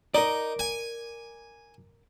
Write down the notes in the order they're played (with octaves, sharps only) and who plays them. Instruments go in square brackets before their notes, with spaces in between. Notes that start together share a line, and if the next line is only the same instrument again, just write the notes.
[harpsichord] D#4 [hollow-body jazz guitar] A#4 D5
[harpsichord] G#5